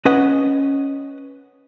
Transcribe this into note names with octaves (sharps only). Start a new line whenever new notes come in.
C#4 B4 D#5 F#5